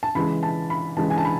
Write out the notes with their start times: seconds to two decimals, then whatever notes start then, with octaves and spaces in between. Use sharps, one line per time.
0.03 A5
0.15 C#3 E3 G#3 B5
0.43 A5
0.70 B5
0.97 C#3 E3 G#3 A5
1.10 G#5
1.18 A5
1.25 B5